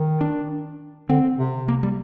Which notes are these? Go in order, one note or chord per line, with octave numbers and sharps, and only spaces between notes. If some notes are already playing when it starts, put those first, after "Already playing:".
Already playing: D#3
D4
D3 C4
C3
A#3
G3